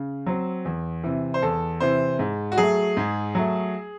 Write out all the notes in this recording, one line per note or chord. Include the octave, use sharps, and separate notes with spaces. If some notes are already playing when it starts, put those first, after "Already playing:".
Already playing: C#3
F#3 C4
E2
C3 E3
C5
E2 A4
C3 E3 C5
G#2
F#4
F#3 A3 G#4
G#2
F#3 A3